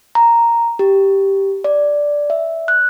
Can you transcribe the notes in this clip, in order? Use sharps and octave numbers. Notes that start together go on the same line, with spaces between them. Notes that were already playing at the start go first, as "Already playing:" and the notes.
A#5
G4
D5
E5
F#6